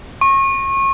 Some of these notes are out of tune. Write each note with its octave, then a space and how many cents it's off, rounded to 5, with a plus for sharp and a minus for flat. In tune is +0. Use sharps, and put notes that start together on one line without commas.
C#6 -30